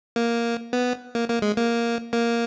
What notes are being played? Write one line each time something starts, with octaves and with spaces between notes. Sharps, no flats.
A#3
B3
A#3
A#3
G#3
A#3
A#3